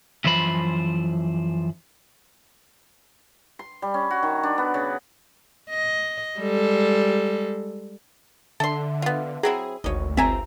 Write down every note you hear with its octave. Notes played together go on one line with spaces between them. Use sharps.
F#2 E3 F3 C5 B5
C6
G3
C#4
F#4
D#3
D4
B3
C#3
D#5
G3 G#3 A4
D3 A4 E5 C6
B3 F4
F#3 C4 E4 G#4
G#1 D2 C#5 D#5
G1 C#2 C4 E5 G#5 A#5